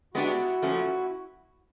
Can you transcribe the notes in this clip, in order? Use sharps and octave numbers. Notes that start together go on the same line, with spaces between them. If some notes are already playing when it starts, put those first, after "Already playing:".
G#3 B3 D4 E4 F#4 G4
A#2 F3 A3 C#4